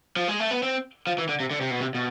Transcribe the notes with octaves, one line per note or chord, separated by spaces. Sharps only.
F3
G#3
A3
B3
C4
F3
E3
D3
C3
D3
C3
B2
C3
B2